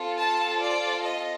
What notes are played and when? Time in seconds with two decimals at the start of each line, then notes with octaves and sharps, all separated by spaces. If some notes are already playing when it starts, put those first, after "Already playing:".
Already playing: C4 F4 A4
0.18 A5
0.62 D5
1.05 D#5